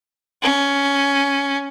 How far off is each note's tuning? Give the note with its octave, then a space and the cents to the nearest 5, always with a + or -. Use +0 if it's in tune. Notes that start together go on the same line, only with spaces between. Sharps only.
C#4 +10